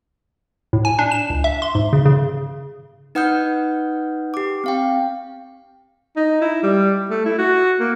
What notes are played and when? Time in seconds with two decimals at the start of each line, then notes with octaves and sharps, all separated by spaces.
0.73 A2
0.85 G#5
0.99 D4
1.11 E7
1.30 C#2
1.44 E5
1.62 C6
1.75 G#2
1.93 C#3
2.05 C#3
3.15 D#4 B4 F#5 D#6 F6 G6
4.34 G4 D6
4.64 C4 F5 G5
6.16 D#4
6.42 E4
6.63 G3
7.10 A3
7.26 E4
7.38 F#4
7.80 A#3